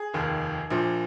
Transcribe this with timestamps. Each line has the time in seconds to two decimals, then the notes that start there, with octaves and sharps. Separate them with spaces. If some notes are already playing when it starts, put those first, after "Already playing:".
Already playing: G#4
0.13 F1 D#2 D#3
0.71 A#1 A#2 F3